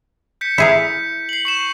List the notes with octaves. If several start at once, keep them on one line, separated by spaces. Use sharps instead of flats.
G6 B6 C#7
E4 G#4 A#4
C7 F#7
C#6 C7 E7